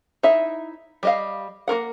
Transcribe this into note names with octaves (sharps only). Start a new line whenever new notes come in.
D#4 E4 E5
G3 D#5 F5
A#3 F4 A#4 F#5